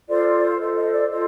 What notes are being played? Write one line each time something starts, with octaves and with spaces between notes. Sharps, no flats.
F4 A4 C5 D5
F4 A4 C5 D#5
D#5
D5
F4 A4 C5 D#5